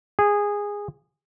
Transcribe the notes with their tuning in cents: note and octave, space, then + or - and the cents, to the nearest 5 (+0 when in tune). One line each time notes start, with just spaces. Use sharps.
G#4 -15